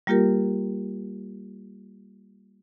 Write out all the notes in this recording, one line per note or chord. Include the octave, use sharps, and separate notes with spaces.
G3 A#3 F4 G4 A#4